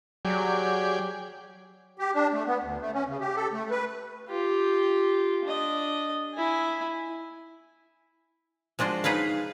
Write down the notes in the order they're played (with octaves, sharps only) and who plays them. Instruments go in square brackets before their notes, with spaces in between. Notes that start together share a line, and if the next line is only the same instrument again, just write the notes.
[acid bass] F#3 [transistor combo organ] G4 G#4 D5
[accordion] G4
D4
A3
B3
D2
A3
C#4
C#3
G4
A4
A3
B4
[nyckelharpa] F4 G4
D4 D#5
E4 G#5
[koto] F3 G#3 D4 F#4 C5
D#4 G#4 B4 C#5 F5